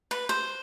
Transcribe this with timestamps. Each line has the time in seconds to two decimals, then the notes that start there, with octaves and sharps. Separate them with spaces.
0.11 B4
0.29 C5